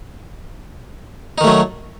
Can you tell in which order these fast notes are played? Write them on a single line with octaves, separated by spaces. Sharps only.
D#4 D#3 A3 F#3